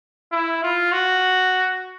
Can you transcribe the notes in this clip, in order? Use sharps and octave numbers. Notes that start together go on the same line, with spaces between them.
E4
F4
F#4